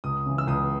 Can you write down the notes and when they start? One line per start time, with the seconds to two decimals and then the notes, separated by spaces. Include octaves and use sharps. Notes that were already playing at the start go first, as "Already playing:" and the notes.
0.04 C#2 D#6
0.26 C#3 E3
0.38 E6
0.47 C#2 D#6